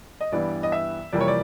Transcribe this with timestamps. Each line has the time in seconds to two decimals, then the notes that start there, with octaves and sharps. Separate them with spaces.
0.21 D#5
0.32 G2 E3 G3 B3 D5
0.63 D#5
0.72 E5
1.13 F2 C3 E3 G3 A#3 D5
1.21 C#5
1.28 D5